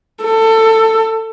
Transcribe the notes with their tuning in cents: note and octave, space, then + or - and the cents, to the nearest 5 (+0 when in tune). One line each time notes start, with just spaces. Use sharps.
A4 +20